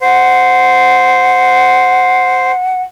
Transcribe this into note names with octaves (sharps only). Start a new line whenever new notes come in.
C5 F#5